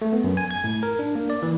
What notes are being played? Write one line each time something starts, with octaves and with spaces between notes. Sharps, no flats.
A3
B3
F#2
G#5
G#6
A2
A#4
D4
A#3
D5
E3